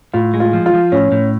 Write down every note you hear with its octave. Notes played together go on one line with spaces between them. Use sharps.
A2 F4
G#3
F4
F3
F4
F3
A2 C#4
A2